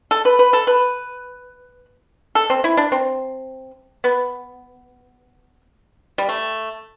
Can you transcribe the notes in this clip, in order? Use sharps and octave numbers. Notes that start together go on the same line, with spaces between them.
A4
B4
B4
A4
B4
A4
C4
E4
D4
C4
B3
G3
A3